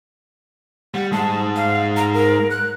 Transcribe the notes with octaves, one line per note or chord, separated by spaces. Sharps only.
G3 F#5
G#2 G#3 A5
F5
A#5
A#4
F#6